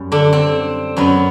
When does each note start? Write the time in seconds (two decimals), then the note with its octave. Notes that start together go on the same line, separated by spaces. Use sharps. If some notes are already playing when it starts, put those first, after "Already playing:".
Already playing: F#2 G3
0.12 D3 D4
0.33 C4
0.97 F#2 F#3 B3